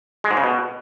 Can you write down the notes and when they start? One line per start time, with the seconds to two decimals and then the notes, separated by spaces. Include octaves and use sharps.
0.24 G#3
0.31 G#2
0.37 C#3
0.44 B2